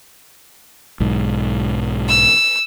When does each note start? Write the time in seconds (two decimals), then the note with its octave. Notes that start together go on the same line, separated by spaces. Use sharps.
1.00 B1 G#2
2.09 E6